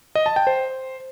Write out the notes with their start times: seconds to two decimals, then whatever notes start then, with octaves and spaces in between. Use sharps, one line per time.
0.15 D#5
0.26 A5
0.36 G5
0.47 C5